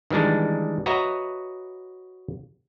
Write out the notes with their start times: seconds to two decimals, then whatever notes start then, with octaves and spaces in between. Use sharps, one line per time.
0.11 D#3 E3 G3 G#3 D4
0.86 F#4 B4 C#5 D#5 E5 A#5